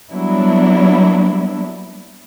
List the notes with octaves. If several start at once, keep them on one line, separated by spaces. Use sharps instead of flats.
F#3 G3 A#3 B3 D4 E4